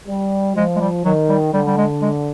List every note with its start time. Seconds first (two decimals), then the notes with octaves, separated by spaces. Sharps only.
0.08 G3
0.56 F3 G#3
0.76 G#3
0.81 G3
1.05 D#3 F#3
1.29 G3
1.53 D3 G3
1.67 G3
1.78 G#3
2.02 G#3